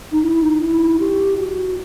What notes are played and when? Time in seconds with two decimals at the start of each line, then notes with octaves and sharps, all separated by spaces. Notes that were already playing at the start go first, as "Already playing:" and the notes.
0.12 D#4
0.23 E4
0.42 D#4
0.61 E4
0.99 G4
1.39 F#4